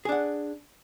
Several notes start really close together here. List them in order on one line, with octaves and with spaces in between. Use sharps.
G#4 D4 F#5